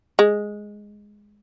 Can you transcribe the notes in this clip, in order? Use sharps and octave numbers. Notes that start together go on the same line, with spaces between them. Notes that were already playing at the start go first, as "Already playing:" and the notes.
G#3